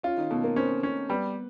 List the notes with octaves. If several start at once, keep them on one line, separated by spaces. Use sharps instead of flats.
C#4 F4
D#3 D#4
B2 A3 A4
A#3 A#4
C4 C#4 C5
C#4
G3 B3 B4